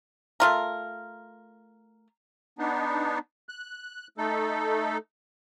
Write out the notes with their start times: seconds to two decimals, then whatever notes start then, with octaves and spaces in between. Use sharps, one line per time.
0.40 A3 F4 A#4
2.59 B3 D4 D#4
3.49 F#6
4.18 A3 D#4 A4